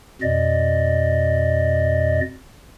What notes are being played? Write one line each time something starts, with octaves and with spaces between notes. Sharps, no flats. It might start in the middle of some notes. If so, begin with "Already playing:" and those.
F2 B2 D5 D#5